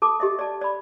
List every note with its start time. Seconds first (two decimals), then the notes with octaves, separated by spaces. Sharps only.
0.02 A4 A5 D6
0.20 G4 D#5 E5
0.39 D5 A5
0.61 D5 B5